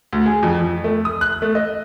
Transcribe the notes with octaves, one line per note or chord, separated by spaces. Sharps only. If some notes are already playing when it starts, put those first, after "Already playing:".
D2
G#4
F2
F2
A3
D#6
F#6
A3
D#5